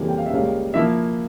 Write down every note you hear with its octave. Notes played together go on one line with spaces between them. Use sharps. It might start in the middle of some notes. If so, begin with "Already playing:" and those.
Already playing: F2 C#3 E3 G3 A#3
G5
F5
E5
C#2 C#3 G3 A#3 F5
F3 A#3 E4 E5